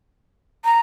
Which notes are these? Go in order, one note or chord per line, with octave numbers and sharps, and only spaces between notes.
A#5